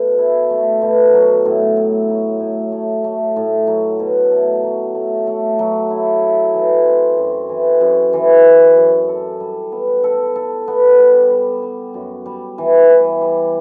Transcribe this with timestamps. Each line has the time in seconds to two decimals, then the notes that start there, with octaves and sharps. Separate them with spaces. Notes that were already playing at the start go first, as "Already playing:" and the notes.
Already playing: B2 A3
0.18 E4
0.50 A3
0.82 B2
1.13 F#3
1.45 A2
1.77 A2
2.09 F#3
2.40 A2
2.72 A3
3.04 A3
3.36 A2
3.67 F#3
3.99 B2
4.32 A3
4.63 F#3
4.95 A3
5.27 A3
5.59 F#3
5.90 E4
6.22 E4
6.54 E3
6.85 C4
7.17 F#2
7.49 E3
7.81 F#2
8.13 E3
8.45 F#2
8.76 F#2
9.09 A4
9.40 G3
9.72 B3
10.04 A4
10.36 A4
10.68 B3
10.99 G3
11.30 G3
11.62 G3
11.94 F#2
12.26 G3
12.58 E3
12.90 E3
13.21 G3